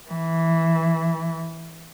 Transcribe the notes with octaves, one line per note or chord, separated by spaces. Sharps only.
E3